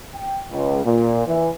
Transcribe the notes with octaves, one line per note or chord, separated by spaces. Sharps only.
G5
C#2
A#2
E3